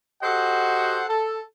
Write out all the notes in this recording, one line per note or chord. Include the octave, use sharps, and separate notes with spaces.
F#4 G4 A4 C5 D#5 F#5
A4